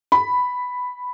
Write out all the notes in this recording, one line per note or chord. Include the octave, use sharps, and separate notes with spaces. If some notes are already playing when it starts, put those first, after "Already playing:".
B5